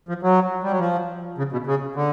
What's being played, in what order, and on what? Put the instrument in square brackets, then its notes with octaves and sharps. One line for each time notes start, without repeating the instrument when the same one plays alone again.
[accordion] F3
F#3
G3
F#3
F3
C#3
B2
C#3
D3